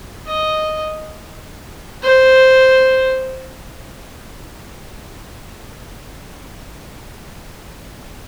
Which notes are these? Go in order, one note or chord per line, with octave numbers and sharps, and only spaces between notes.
D#5
C5